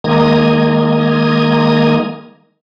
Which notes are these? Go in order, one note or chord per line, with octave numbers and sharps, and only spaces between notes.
D#3 G#3 A#3 A#5 D#6 G#6